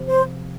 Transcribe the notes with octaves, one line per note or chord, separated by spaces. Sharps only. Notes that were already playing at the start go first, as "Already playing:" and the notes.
Already playing: C3 F3
C5